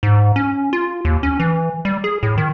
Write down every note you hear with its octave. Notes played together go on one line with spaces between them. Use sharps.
G#2
C#4
F4
D#2
C#4
E3
G3
G#4
A2
D#3